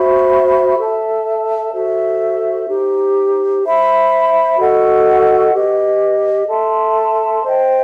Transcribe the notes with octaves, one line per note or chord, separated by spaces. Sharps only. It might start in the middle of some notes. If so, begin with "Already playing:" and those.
Already playing: F#4 C5 E5 B5
A4 E5 A5
F#4 A4 C5 E5
D#4 G4 C5
C5 E5 B5
F#4 A4 D#5 F#5
G4 B4 D#5
A4 E5 A5 C6
C5 D#5 G5